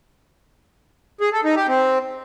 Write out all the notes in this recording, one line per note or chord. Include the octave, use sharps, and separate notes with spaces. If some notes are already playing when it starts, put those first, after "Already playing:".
G#4
A4
D#4
G4
C4